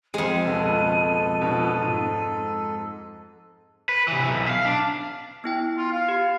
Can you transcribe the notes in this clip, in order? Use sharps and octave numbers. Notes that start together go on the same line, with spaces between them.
F2 G#3 G#4 D#7
C#2 B2 A4
B2 F3 D4
G#2
B4
C3 E3
B1
E5 F5
D4
B3 E4 G5
F4
F5
G4